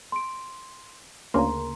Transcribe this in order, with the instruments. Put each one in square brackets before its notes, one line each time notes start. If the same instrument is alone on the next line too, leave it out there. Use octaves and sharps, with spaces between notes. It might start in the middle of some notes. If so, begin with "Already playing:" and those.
[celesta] C6 D7
[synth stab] D2 C#3 A#3 [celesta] A#5 C6